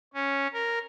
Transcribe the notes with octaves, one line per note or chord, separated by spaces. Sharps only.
C#4
A#4